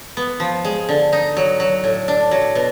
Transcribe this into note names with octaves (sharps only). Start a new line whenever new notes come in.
B3
F3
G#3
D3
D#4
F#3
F#3
A2
D4
F#3
B2